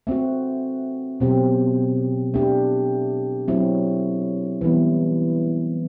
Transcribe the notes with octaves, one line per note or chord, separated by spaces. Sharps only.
A3 C4 F#4
B2 F#3 C4 G4
A3 D4 G4
F#3 A3 C4 E4
E3 G3 B3 E4